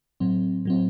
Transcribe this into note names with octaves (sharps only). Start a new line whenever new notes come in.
A2 F#3 C4
A2 F#3 C4